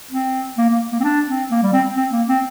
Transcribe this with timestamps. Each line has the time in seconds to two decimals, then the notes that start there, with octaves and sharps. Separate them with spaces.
0.11 C4
0.58 A#3
0.70 A#3
0.92 A#3
1.00 C4
1.04 D4
1.28 C4
1.51 A#3
1.62 G3
1.73 C4
1.96 C4
2.12 A#3
2.28 C4